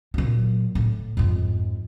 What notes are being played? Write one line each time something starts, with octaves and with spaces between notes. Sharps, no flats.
A#2 F#3
A2
F2 G#2